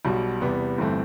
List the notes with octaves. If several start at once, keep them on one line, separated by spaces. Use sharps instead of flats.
B1 B2 G3
E2 C3 G3 B3
G1 G2 E3 A3 C4